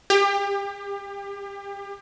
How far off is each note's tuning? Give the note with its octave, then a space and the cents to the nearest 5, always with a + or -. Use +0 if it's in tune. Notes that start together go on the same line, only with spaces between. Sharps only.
G4 +30